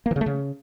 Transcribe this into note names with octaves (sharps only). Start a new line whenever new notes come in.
A#3
E3
C#3
A3
C#3